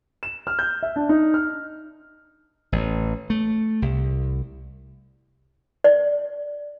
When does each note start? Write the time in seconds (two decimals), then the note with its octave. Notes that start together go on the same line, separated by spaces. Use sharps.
0.23 E7
0.47 F6
0.59 G6
0.83 E5
0.96 D4
1.09 D#4
1.34 F6
2.72 A1
3.30 A3
3.82 C2
5.84 D5